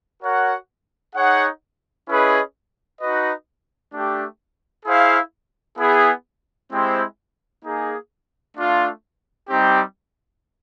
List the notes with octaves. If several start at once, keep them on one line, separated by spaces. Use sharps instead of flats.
F#4 A#4 C#5 F#5
D#4 G#4 C#5 F#5
C#4 E4 G#4 B4 D#5
D#4 F#4 B4 D#5
A3 D4 G4
E4 G#4 C5 F5
B3 E4 G#4
G#3 C4 E4 G4 C5
A#3 D#4 G#4
A3 D4 F4
G3 C4 D#4 G4